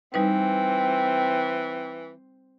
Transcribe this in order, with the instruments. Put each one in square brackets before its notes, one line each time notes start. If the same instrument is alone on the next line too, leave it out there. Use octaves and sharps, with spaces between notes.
[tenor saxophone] E3 [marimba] G3 D#4 B4 [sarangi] C4